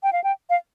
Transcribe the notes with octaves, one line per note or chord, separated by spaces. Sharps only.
G5
F5
G5
F5